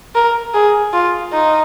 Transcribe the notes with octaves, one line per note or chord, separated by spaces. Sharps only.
A#4
G#4
F4
D#4